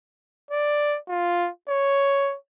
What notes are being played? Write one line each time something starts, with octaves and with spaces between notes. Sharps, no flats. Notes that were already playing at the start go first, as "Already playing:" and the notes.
D5
F4
C#5